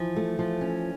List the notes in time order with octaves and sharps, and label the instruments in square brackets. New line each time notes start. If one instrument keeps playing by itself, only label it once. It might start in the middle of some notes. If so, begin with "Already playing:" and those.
Already playing: [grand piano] E3 [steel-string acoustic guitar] F3
[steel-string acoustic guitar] A3
F3
C#4